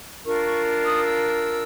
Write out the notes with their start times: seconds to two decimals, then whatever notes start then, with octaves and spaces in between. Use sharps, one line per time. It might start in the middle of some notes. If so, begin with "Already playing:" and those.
0.25 D4 F4 A#4 C#6
0.45 C#6
0.84 D#6
1.04 E6